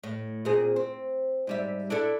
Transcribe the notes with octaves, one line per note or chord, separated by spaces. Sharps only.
A2
A#2 C4 G#4
C4
G#2 G3 E5
D4 E4 A4